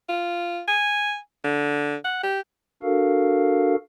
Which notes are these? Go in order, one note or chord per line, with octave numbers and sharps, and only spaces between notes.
F4
G#5
D3
F#5
G4
D4 F#4 A4 A#4 F5